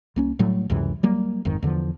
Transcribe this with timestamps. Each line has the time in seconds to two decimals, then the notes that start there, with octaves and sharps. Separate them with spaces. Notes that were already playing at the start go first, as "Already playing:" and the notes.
0.16 C2 A#3 C#4
0.39 A2 F#3 G3 A3
0.70 C#2 F#2 C3 E3
1.03 F#3 G3 A#3
1.45 G#1 F2 G#2 D#3
1.62 E2 D3 E3 F3